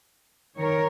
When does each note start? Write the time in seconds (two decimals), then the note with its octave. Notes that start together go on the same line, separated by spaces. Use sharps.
0.58 D#3 A#4 C#5